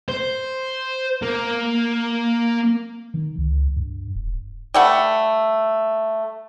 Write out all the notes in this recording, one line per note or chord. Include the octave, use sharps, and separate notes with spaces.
C5
A#3
D#3
C#2
G2
D#1
G3 A3 F#5